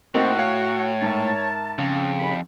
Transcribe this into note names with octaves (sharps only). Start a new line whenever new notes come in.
A2 A#3 C4 D#4 F#4
C#5 F5
G#2 A#4 E5 A5
F2 C#3
D#2 B5